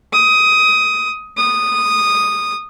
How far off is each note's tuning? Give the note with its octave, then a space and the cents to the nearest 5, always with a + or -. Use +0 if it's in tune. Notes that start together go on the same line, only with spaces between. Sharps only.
D#6 +15
D#6 -10